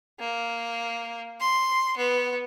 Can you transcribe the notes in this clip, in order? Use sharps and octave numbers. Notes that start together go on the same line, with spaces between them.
A#3
C6
B3